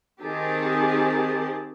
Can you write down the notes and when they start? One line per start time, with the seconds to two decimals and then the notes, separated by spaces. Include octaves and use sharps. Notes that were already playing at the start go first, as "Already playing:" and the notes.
0.22 D#3 C4 G4 G#4 A5